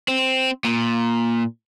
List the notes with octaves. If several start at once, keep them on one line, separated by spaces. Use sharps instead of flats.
C4
A#2